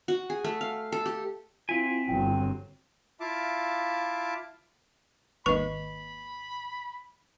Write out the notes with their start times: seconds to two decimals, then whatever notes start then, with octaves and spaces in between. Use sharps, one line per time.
0.08 F#4
0.30 G#4
0.44 A3
0.61 F5
0.92 A4
1.06 G4
1.69 C4 E4 F4 G#5 B6
2.09 G1 F#3 G5
3.20 E4 F4 E5 F5 A5 D6
5.46 G#1 D#2 B4 D#5 B5 C#6